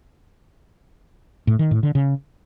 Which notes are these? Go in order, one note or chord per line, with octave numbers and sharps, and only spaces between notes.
A2
D#3
A2
D3
C#3